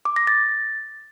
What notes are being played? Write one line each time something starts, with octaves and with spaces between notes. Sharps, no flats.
D6
A#6
A6